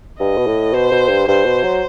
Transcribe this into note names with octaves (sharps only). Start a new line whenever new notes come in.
G2 D#5
B2
A2
B2 C5
B2
G2
G2 C5
B2
F#3